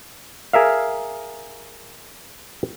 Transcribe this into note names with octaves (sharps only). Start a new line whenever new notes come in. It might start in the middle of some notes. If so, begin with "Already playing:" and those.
G#4 A#4 E5 F5